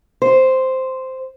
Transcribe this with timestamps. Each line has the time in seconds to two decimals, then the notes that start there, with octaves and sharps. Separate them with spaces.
0.22 C5